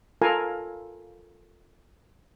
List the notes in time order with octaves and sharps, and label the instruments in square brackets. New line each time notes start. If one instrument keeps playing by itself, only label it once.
[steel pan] F4 A4 A#4 F5 G#5 A5